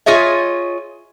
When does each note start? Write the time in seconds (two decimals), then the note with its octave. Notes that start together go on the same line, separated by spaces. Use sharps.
0.06 F4 G#4 C#5 D#5 E5